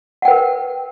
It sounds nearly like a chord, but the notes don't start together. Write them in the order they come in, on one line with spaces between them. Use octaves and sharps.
F#5 G5 B4 A#4